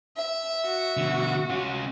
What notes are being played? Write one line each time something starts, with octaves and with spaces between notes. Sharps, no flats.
E5
F#4
B2 D3
C#4 F4